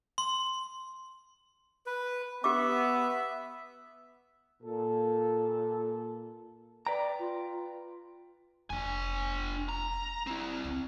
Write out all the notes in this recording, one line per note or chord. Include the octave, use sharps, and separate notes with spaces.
C6
B4
B3 G4 E5 D6
A#2 A4
B4 D5 G5 A#5
F4
F1 E2 D4 G#5
A#5
C4 E4
C#2